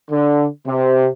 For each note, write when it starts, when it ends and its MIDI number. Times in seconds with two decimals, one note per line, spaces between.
0.11 0.46 50
0.66 1.09 48